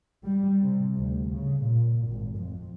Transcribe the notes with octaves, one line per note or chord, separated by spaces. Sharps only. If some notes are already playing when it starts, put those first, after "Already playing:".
G3
C3
D2
C#3
A#2
G#1
F2